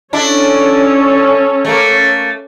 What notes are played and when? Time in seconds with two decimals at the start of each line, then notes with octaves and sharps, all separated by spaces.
0.13 C#4 D4 E4 A4 C#5
1.65 A3 A#3